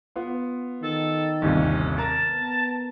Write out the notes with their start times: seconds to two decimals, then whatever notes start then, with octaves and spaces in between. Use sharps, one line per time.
0.16 B3 F4
0.83 D#3 A4
1.42 G1 D#2 C3 C#4
1.98 A#4 A5 A#5
2.31 B3